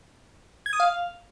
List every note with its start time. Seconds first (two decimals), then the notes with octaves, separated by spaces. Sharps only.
0.66 G#6
0.73 D#6
0.80 F5